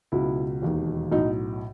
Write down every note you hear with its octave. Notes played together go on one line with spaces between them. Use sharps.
C#2 B2 F#3 E4
E1 D#2 D#3
B1 A2 F#3 D#4